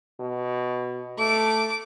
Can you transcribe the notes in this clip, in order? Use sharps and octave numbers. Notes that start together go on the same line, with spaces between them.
B2
A3 D6